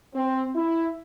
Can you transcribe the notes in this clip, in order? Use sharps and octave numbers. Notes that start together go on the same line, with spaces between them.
C4
E4